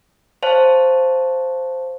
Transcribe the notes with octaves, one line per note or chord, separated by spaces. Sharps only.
C5 C#5 F5 A5